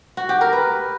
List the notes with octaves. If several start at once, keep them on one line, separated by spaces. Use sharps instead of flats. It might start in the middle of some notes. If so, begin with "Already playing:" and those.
F#4
G4
A#4
B4